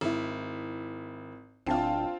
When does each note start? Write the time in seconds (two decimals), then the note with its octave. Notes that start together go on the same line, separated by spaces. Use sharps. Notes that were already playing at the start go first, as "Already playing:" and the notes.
0.01 G#1 E4
1.66 D1 C4 D4 F4 G5 A5